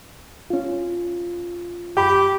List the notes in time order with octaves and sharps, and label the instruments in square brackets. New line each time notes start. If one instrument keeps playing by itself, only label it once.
[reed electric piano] C#4 F4
[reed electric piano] F#2 B5 [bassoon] G4